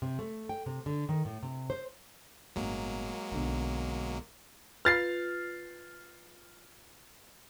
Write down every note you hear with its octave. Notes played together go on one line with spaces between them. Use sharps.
C3
A3
G5
C3
D3
D#3
A2
C3
C5
G1 A2 F#3 G#3 A#3
B1 D3
F4 B4 F6 A6 C7